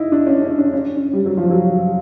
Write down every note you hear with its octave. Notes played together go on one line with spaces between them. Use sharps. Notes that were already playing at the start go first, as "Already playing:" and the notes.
Already playing: D#4 E4
D4
C#4
C#4
D4
C#4
G3
F#3
F3
F#3